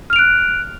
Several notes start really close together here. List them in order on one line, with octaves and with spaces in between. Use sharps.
F6 F7 D7 F#6